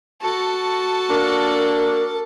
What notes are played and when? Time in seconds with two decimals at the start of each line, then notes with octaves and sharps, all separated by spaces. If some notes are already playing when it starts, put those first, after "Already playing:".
0.22 F#4 A4 A5
1.09 A#3 D4 A#4